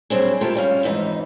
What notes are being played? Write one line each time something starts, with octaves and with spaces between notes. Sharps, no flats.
F#3 G3 C4 D4 G#4
A#3 E4 F4 G4 A4
G3 C#4 F5
F2 G#2 E3 D#4